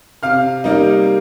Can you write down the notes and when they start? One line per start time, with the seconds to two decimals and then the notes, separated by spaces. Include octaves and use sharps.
0.23 C3 F5 F6
0.64 G3 A#3 D#4